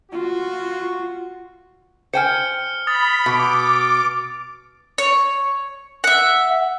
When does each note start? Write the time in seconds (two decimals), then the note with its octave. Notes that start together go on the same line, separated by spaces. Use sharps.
0.12 F4 F#4
2.13 C5 G5 G#5 F6 C#7
2.87 B5 D#6 A6
3.26 B2 D6
4.98 C#5
6.04 E5 F#5